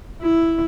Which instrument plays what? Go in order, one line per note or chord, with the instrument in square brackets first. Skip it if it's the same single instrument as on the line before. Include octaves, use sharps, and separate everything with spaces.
[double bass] E4